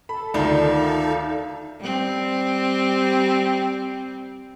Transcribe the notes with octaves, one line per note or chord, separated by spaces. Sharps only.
A4 B5
D2 D#3 D#4 F4 D5
G3 C4